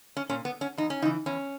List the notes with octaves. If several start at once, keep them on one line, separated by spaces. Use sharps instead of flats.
C#4
A#2 C#4
B3
C#4
E2 D#4
C#4
C#3 E3 D#4
E2 C#4